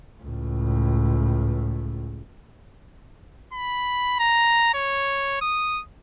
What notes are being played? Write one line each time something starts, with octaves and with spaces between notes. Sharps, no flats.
C#2 A2
B5
A#5
C#5
D#6